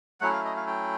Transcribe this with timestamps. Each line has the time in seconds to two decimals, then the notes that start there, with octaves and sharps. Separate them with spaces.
0.21 F#3 A3 C#4 E4 F#5
0.33 F5
0.45 D#5
0.56 F5
0.67 G5